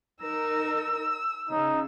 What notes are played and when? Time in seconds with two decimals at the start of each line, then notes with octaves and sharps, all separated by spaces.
0.22 D#4 A#4 E6
1.49 C#3 D#4